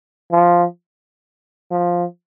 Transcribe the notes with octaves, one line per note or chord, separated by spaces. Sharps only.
F3
F3